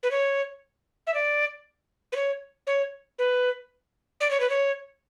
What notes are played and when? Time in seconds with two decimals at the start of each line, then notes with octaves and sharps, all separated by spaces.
0.03 B4
0.11 C#5
1.07 E5
1.14 D5
2.12 B4
2.16 C#5
2.67 C#5
3.19 B4
4.21 D5
4.31 C#5
4.40 B4
4.50 C#5